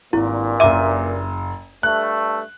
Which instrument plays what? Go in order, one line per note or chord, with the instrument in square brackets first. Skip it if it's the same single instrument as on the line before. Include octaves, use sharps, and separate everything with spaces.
[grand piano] G#1 [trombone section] G2 A#2 [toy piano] E4
[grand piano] F#1 D#7 [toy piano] E5 D6
[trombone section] G2 A3 [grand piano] F#6